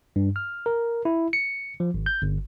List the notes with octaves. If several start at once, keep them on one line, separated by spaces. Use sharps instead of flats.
G2
F6
A#4
E4
C#7
F3
G#1
G6
G1